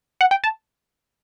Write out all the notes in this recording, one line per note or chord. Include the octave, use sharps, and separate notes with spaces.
F#5
G5
A5